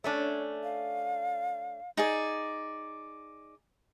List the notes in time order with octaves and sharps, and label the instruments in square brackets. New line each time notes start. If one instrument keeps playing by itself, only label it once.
[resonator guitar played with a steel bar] A3 C#4 D4 [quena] C#5
[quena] F5
[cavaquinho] D#4 G#4 D5